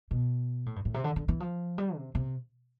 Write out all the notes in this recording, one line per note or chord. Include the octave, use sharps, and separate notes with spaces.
B2
A2
G2
A2
C3
D3
D3
E3
F3
G3
C3
C3